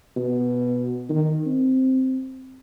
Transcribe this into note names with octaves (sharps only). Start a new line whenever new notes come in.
B2
D#3
C4